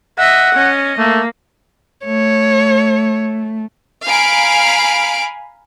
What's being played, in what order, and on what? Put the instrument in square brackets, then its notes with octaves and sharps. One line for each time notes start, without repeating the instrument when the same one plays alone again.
[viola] D#5 E5 [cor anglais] F#5
[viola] C#4 D#5
[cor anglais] A3 [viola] A#3
[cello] A3 [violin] C#5
[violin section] F5 G#5 A#5 B5 D7